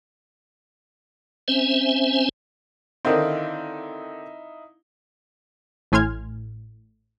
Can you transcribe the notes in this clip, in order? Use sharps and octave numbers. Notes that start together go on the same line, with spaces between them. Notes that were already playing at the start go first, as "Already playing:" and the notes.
C4 C#4 C5 E5 G#5
D3 D#3 C4 D#4 E4 F5
A1 A2 G#5 C6 F6 G#6